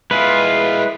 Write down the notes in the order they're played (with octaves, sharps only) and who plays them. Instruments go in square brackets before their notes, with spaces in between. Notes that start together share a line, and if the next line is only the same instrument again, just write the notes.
[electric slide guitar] G#3 E4 G#4 [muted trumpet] F4 [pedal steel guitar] B4